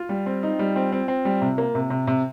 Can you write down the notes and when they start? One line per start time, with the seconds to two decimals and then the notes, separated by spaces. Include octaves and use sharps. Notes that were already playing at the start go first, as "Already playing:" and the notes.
Already playing: F4
0.09 G3
0.26 C4
0.43 D#4
0.59 G3
0.76 C4
0.92 C4
1.08 C4
1.25 G3
1.42 C3
1.58 A#3
1.75 C3
1.90 C3
2.07 C3